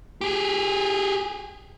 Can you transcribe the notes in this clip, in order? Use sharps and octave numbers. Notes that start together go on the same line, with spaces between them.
G4 G#4